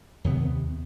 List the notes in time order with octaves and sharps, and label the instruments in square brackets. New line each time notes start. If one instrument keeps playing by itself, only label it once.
[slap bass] D#2 C3 B3